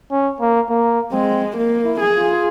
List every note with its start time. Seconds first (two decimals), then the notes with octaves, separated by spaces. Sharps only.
0.11 C#4
0.40 A#3
0.69 A#3
1.12 G#3 C4
1.57 A#3
1.85 E4
2.00 G#4
2.14 F4